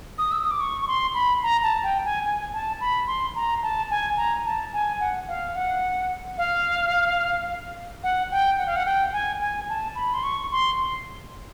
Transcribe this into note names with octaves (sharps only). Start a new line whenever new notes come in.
D#6
E6
D#6
D6
C#6
C#6
C6
B5
A#5
A5
G5
G#5
G#5
A5
B5
C6
A#5
A5
G#5
A#5
A5
G#5
F#5
F5
F#5
F5
F#5
G5
F#5
F5
F#5
G5
G#5
G#5
A5
B5
C6
C#6
C6